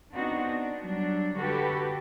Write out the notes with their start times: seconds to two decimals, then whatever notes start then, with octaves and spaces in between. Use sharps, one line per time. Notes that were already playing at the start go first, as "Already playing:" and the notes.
0.13 B3 C4 D4 D#4 F#4
0.47 D4
0.81 F#3 G3 D4
1.37 D3 F#4 G4 A4 B4